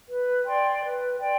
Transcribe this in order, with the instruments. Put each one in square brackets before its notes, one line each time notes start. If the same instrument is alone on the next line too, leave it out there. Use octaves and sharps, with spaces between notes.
[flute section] B4
D5 G5 C6
B4
D5 G5 C6